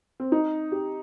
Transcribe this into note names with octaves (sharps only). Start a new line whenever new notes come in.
C4
D#4
G4